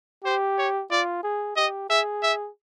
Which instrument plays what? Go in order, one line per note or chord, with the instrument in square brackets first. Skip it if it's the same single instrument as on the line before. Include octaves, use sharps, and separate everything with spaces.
[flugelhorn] G4 [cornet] C5
[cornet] C#5
[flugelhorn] F4 [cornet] D5
[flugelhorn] G#4
[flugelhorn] G4 [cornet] D#5
[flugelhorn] G#4 [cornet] E5
[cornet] E5